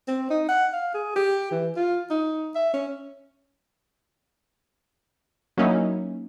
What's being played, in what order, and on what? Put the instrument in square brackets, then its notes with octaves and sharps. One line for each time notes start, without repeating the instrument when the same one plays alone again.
[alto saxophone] C4
D#4
F#5
F5
G#4
G4
E3
F4
D#4
E5
C#4
[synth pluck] F#3 A#3 C#4 D#4 E4